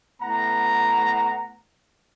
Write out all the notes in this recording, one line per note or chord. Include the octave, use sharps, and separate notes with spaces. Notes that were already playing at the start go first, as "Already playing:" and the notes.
A2 B3 F#5 A#5